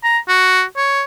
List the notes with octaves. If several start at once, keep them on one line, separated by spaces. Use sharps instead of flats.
A#5
F#4
C#5